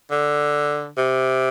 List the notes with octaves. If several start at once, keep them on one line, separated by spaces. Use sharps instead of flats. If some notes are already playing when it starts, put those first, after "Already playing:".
D3
C3